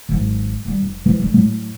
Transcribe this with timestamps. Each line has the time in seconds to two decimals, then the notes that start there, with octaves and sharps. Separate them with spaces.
0.09 G#1 F#3
0.65 D#3 G3
0.83 F1
1.05 E3 F3
1.20 G#3 D4
1.34 A2 F#3